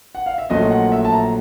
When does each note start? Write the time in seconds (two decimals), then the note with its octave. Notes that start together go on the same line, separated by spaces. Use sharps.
0.15 F#5
0.26 F5
0.38 E5
0.50 A#1 A#2 F#3 A3 D#5
0.71 F#5
0.92 E5
1.05 A5
1.13 A#5